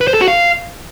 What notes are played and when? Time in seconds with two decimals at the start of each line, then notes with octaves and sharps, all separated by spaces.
0.01 B4
0.07 C5
0.14 A4
0.21 F#4
0.28 F5